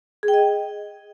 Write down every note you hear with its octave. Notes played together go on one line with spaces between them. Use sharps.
G#4
G5
D#5